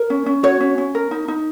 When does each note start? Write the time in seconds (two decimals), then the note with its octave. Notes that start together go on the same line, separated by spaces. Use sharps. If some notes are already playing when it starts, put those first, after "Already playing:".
Already playing: A#4
0.10 C#4
0.26 C#4
0.43 F#4 C#5
0.61 C#4
0.78 C#4
0.95 A#4
1.11 D#4
1.28 D#4